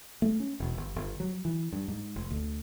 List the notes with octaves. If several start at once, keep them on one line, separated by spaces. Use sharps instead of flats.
A3
C#4
E1
G1
G1
F#3
E3
G2
G#2
F1
D2